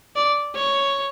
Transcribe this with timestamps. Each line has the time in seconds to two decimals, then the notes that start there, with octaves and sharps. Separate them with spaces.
0.16 D5
0.55 C#5